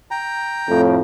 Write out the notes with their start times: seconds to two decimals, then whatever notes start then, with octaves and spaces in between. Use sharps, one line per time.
0.11 G5 A#5
0.68 F2 A2